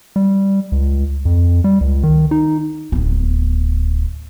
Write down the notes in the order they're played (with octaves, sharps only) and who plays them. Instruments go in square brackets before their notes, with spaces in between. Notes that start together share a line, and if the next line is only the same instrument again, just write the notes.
[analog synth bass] G3
C#2
F2
G3
C#2
D#3
D#4
[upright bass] D1 B3